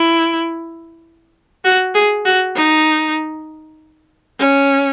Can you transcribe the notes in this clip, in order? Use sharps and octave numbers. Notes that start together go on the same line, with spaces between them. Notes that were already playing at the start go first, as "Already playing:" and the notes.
Already playing: E4
F#4
G#4
F#4
D#4
C#4